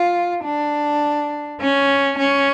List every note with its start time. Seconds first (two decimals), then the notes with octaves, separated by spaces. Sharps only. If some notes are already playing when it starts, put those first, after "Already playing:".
Already playing: F4
0.44 D4
1.60 C#4
2.18 C#4